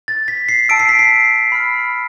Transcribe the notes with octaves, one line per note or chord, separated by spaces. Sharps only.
A6
B6
C7
A5 E6 D7
C7
B6
C7
B5 F6